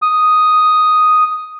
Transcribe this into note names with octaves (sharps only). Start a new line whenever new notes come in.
D#6